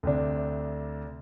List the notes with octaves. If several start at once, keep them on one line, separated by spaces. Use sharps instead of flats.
D2 C3 D4